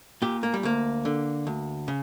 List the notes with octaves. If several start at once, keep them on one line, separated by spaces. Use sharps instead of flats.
A#2 G4
A#3
G3
D2 A#3
D3
D2
C#3